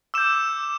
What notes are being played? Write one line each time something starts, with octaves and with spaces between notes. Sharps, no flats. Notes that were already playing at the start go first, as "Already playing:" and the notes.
D6 E6 G6 E7